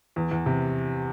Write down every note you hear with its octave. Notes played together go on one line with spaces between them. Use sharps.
E2
E2
C3